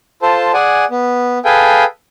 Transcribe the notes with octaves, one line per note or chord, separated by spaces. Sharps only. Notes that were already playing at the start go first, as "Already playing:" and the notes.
F4 A4 C5 A5
G#4 D5 F#5 G#5
B3
G#4 A4 B4 F5 G5 G#5